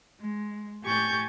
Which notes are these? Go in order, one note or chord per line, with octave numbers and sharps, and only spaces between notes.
G#3
A2 G4 G#5 C#6 G6 A6